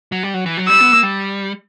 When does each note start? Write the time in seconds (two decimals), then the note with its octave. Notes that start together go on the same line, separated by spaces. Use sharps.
0.12 F#3
0.23 G3
0.34 F#3
0.46 E3
0.57 F#3
0.68 G3 E6
0.80 B3
0.92 A#3
1.03 G3